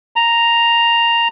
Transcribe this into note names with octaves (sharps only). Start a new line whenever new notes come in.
A#5